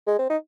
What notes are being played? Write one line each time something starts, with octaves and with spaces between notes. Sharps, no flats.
G#3
C4
D#4